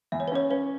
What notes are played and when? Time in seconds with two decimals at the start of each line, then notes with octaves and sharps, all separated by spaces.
0.12 E2 E5
0.20 C#5
0.28 B4
0.32 C#4 C#5
0.50 C#4 B4